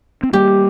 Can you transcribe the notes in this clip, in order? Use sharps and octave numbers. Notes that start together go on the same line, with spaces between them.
C4
G3 A#3 G4